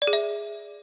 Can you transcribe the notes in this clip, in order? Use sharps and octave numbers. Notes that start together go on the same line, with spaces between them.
D5
G#4
E5